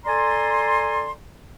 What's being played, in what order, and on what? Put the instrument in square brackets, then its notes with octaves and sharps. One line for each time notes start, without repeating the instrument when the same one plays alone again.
[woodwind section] A4 D5 G#5 A#5 C6